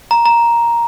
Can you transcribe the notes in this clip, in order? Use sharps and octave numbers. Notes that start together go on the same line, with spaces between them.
A#5
A#5